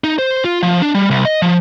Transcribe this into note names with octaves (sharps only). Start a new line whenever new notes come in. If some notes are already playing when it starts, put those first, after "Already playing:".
D#4
C5
F4
F3
D4
G3
C2
D#5
F3